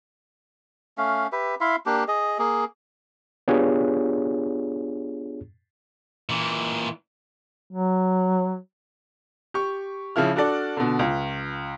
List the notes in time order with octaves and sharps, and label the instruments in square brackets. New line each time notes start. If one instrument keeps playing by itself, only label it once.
[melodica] A3 C#4 F5
G4 B4 E5
E4 E5 F5 C6
A#3 D4 G4
G#4 D#5
A#3 G#4
[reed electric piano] B3 D4 F4 G4 G#4 C#5
[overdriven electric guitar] A#2 E3
[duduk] F#3
[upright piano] G4 C#6
C#3 F3 E4 F6
D4 F#4 A4 D5
B2 D3
C#2